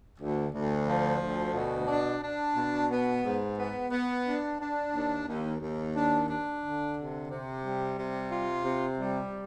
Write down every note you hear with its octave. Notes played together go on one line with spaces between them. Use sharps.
D2
D2
F3
D2
B2
D4
D4
B2
B3
G#2
B3
B3
D4
D4
D#2
D#2
D#2
D4
D4
D3
C3
C3
G3
C3
F4
C3
G3